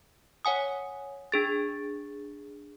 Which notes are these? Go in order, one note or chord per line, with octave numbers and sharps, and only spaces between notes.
C#5 F#5 G#5 D#6
D4 G#4 A6